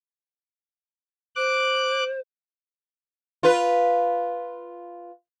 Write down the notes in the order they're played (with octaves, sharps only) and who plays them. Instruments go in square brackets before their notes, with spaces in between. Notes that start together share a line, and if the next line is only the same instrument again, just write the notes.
[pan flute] C5 [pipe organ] D6 F#6
[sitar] F4 B4